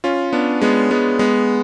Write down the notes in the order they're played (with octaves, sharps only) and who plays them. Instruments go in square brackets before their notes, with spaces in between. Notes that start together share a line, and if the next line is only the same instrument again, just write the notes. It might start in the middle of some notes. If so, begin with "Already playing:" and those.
[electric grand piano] C#4 F4
B3 D4
G#3 B3
G#3 B3
G#3 B3